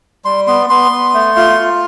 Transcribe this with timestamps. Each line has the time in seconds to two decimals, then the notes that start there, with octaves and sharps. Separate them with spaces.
0.25 G3 C6
0.47 B3 C6
0.70 B3 C6
0.91 B3
1.14 A3
1.36 F4
1.59 F4